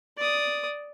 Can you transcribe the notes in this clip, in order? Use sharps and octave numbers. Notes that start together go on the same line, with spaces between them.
D5 D#6